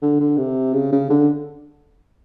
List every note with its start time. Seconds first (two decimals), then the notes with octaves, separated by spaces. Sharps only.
0.02 D3
0.20 D3
0.37 C3
0.73 C#3
0.92 C#3
1.10 D3